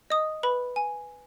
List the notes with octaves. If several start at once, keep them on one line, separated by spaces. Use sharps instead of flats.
D#5 D#6
B4 B5
G#5